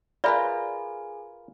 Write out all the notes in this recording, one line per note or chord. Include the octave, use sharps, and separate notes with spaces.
F4 G#4 A#4 B4 D5 E5 G#5 B5